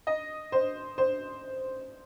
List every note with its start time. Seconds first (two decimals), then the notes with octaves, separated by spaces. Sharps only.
0.07 D#5
0.52 C5
0.98 C5